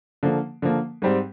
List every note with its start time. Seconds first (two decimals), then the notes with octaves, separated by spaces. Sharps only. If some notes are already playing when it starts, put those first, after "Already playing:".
0.23 D3 F3 A#3
0.62 D3 F3 A#3
1.02 G#2 G3 C4